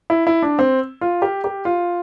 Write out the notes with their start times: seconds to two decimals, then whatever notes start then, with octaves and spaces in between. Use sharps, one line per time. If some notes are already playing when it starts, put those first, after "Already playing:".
0.10 E4
0.27 E4
0.42 D4
0.59 C4
1.01 F4
1.22 G4
1.44 G4
1.65 F4